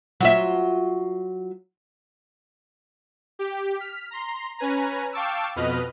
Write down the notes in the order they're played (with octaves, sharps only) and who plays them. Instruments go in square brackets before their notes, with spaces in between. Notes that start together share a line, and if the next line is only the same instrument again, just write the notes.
[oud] F#3 F4 E5
[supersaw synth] G4
F6 B6
A#5 C6
C#4 B4 G#5 A#5
F5 G5 A5 C#6 D6 E6
F2 B2 B4 D#5 F6